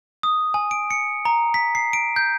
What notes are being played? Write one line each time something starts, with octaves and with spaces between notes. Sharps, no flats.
D#6
G#5
D7
C#7
A#5
B6
C7
D7
G6